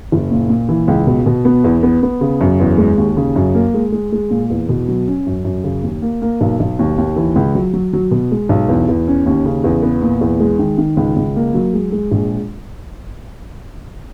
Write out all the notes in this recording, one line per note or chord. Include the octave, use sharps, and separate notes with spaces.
F#1
A#2
A#2
E3
C#2
B2
B2
B3
E2
B3
B3
C#3
F#2
E2
G#3
D#2
C#3
F#2
A#3
G#3
G#3
G#3
A#2
E2
B2
F#3
C#4
F#2
F#2
C#3
D#2
A#3
A#3
B1
B1
D#2
D#2
E3
C#2
F#3
F#3
F#3
B2
G#3
B1
E2
E2
C#4
D#2
C#3
E2
B3
A#2
E2
G#3
D#3
D#3
C#2
C#2
A#3
F#3
G#3
G#3
A#1